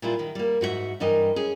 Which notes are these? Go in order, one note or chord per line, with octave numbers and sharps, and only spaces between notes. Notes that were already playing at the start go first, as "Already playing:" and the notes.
A#2 G3 E4 F4
D#3
G3 A#3
G#2 F#4 A#4 E5
G2 E3 G3 A#4 D#5
C#4 G#4